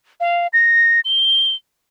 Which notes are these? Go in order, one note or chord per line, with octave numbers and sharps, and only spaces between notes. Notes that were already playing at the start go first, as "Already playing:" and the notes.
F5
A#6
G7